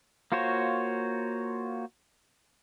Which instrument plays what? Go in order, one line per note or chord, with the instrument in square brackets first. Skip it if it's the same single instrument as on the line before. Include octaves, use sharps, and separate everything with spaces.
[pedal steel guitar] A#3 F4 F#4 C5 C#5